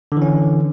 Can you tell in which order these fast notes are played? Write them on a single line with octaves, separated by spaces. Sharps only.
D3 E3 C#4